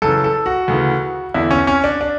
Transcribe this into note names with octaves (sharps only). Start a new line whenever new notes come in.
F#2 C#3 E3 A4
A4
F#4
D2 C#3 E3
E2 D3 E4
C#4
C#4
D4
D4